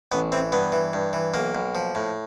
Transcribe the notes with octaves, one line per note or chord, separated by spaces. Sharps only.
A1 B3
E3 C4
G2 B3
E3
G2
E3
B1 A#3
B1
F3
A2